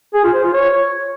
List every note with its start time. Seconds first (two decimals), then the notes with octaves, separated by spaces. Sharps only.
0.14 G#4
0.24 F4
0.34 C5
0.44 F4
0.54 C#5